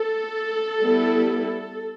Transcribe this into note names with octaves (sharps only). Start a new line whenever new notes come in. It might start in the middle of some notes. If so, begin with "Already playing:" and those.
Already playing: A4
G3 B3 E4